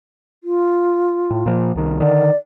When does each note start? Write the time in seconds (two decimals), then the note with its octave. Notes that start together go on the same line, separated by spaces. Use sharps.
0.44 F4
1.31 A2
1.46 A#2 F3
1.75 C2 D#3
2.00 D3 D#3 D5